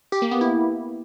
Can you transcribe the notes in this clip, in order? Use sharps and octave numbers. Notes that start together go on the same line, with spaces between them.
G4
A#3
B3
E4